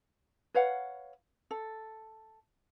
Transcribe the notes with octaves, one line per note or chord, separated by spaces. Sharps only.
B4 C#5 F5 F#5
A4